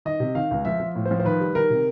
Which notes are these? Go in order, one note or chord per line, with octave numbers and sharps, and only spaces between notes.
D#3 D#5
C3
D#3 F5
C#2
F3 E5
F3
A2
C5
F3
C5
D#3 B4
G3
D#3 A#4
C3